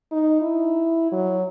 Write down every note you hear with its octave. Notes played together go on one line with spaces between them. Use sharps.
D#4
E4
F#3